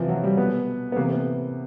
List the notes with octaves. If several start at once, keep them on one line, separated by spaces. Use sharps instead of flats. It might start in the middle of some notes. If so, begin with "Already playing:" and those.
Already playing: C3 E3 F3
F#3
G3
B2 B3
B3
C3 E3 A#3
B3